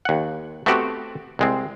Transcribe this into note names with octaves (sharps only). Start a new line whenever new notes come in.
D#2 F#5
A3 B3 C4 F#4 G4
C2 G#3 C4